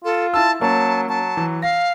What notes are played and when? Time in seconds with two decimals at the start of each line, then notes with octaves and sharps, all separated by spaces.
0.05 F4 A4
0.34 E4 A5 E6
0.61 F#3 A#3 C#4 A5
1.09 F#3 A5
1.37 E3
1.62 F5 A#6